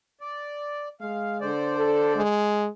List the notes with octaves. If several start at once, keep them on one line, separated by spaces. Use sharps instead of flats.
D5
G#3 F5
D3 C5 D5
A4
G#3